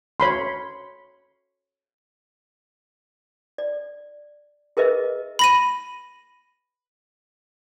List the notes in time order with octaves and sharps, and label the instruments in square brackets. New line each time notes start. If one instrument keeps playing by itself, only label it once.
[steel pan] C#5 B5 C6
[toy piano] D5
G#4 A#4 B4 D#5 E5
[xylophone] B5 A#6 D#7